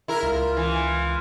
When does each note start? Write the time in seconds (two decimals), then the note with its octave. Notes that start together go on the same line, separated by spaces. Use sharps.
0.08 E4 A#4
0.23 C#2 F4
0.57 E3